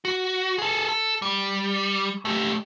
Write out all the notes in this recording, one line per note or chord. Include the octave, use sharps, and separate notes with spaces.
F#4
G#4 A4
A4
G3
A3 G4